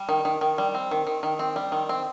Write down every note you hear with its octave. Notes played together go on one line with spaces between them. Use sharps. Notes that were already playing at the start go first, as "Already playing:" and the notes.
Already playing: G3
D#3
D#3
D#3
G3
C4
D#3
D#3
D#3
C4
G3
D#3
C4